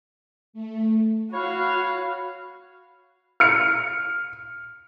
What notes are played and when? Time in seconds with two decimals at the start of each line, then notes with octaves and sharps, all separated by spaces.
0.53 A3
1.33 F#4 C#5 F5 B5
3.40 F6 C#7